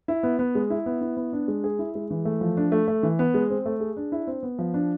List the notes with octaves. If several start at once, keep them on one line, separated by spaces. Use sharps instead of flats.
E4
B3
B3
G#3
E4
B3
E4
B3
D4
G#3
G#4
E4
G#3
E3
A3
F3
D4
A3
A3
E3
B3
G#3
C4
A3
G#4
D4
E4
C4
B3
F3
D4